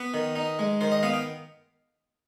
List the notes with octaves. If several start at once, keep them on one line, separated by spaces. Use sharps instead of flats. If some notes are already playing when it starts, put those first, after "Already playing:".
Already playing: B3 B4
D#3
D#4
G#3
D#3 C5
D#5
B3 F5
G5